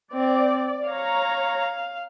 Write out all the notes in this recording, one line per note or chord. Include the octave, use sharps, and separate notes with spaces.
C4 D5
C#5 F5 A#5